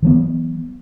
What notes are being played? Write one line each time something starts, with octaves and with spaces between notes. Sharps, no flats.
E3 F#3 B3